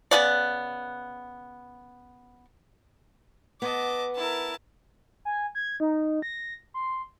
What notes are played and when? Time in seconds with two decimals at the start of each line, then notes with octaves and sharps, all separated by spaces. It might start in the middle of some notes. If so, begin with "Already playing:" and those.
0.11 C#3 G#3 B3 D5
3.62 B3 D#5 A5 D6
4.16 E4 A#4 A5
5.25 G#5
5.55 G#6
5.80 D#4
6.22 A#6
6.74 C6